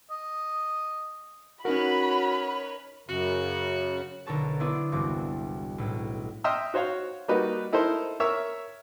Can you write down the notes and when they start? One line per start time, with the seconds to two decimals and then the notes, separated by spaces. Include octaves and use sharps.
0.10 D#5
1.65 C#4 D#4 F#4 A#4 B4 C#5 B5
3.09 F#2 C#3 F#4
4.26 B1 D3 A#4 C#5 A5 E7
4.60 B3 D4 E4 C5 D5
4.92 E1 C2 G2 C4 F#4 D6
5.78 B1 A2
6.44 D#5 E5 G5 C6 E6 F6
6.74 F#4 C5 C#5 F5 F#5
7.28 G3 A#3 D#4 F#4 B4
7.72 D#4 E4 A4 A#4 C5 D#5
8.20 A#4 C#5 E5 C#6 E6